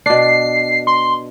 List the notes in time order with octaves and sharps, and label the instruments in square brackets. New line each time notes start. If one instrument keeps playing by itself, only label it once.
[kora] B2 D4 [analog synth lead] C7
[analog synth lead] C6